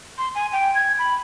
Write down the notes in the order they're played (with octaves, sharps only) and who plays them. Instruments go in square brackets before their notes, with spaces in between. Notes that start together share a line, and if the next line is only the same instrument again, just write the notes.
[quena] C6
G#5
G5
G#6
B5